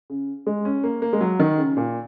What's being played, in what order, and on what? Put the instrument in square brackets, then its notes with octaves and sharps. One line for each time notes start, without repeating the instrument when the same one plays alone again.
[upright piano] C#3
G#3
C#4
A#3
A#3
G#3
F#3
D#3
C#3
A#2